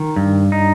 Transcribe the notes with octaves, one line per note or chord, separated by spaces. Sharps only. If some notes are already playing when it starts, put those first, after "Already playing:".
Already playing: D#3
G2
D#4